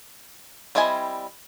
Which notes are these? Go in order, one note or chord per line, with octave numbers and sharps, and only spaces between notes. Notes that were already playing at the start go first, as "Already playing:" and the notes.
G3 C4 E4 D#5 G#5